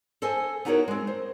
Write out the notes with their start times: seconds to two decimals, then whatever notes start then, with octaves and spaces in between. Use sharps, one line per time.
0.22 A4 C5 D#5 G#5
0.65 B3 D#4 E4 F#4 A#4 C#5
0.88 G#3 C4
1.07 C5